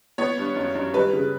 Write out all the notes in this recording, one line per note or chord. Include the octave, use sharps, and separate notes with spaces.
B3 C#5
G2
F#2
F#2
G3 B4
C#3